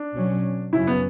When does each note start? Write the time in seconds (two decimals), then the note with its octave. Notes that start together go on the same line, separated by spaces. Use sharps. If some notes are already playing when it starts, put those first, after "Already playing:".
Already playing: D4
0.13 B2 F#3 C#4
0.73 F#2 C#3 F#3 C#4 E4
0.87 B3